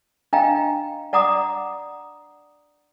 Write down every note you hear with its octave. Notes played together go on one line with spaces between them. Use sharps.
D4 D#5 F5 G5 A#5
D5 F#5 A#5 D6 D#6